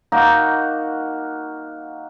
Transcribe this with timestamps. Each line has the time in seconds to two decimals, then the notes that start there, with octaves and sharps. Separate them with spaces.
0.12 A#3 D#4 F#4